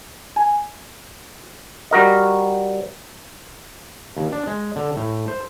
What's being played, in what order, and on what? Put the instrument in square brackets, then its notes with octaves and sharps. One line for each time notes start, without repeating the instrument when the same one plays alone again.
[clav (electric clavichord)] G#5
G3 F#4 A#4 D#5
D#2
D4
G#3
D3
A2
C5